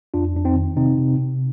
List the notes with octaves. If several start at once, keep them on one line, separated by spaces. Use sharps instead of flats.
F2 D4 F4
F2 D4
C4 D#4
D#3
C3 C4 D#4
C3
C3